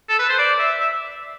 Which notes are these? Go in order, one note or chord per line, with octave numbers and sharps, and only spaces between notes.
A4
B4
C5
D5
E5
E5